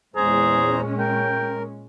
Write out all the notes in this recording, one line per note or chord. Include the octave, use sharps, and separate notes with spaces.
E2 A#2 G#3 C#4 G#4 C5 A#5
A#4 G5